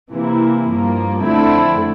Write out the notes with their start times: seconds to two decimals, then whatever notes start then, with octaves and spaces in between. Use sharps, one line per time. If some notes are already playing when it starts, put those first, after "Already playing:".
0.12 C3 E3 A#3 E4
0.67 G2 F3 A#3
1.22 F2 D3 A3 C4 E4